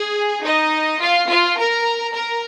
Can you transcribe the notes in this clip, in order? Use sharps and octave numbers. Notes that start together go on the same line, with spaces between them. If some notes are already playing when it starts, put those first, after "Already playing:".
Already playing: G#4
D#4 D#5
F4 F5
F4 F5
A#4 A#5
A#4 A#5